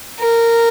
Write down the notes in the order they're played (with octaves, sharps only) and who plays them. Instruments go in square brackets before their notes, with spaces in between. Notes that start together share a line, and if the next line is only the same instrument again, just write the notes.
[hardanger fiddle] A#4